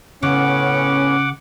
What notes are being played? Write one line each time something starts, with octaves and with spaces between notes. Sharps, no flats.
A2 C#3 B3 C#4 F#5 D6